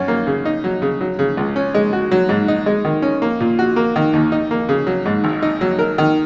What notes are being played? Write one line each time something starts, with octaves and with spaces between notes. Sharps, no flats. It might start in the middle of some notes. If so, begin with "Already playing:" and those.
Already playing: F#2 C#4
A#3
C#3
D#4
F#3
C#3
F#3
C#3
C#2
C#4
G#3
F#4
F#3
G#2
D#4
G#3
D#3
C#4
A#3
A#2
F#4
A#3
D#3
D#2
D#4
A#3
C#3
F#3
G#2
G#1
D#4
F#3
A#4
D#3